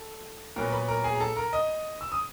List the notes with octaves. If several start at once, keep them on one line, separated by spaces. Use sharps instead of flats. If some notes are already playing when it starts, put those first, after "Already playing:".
Already playing: A4
A#2 F#3 B3 A#4 A#5
B4 B5
A#4 A#5
G#4 G#5
A#5
A4 A5
A#4 A#5
D#5 D#6
E6
D#6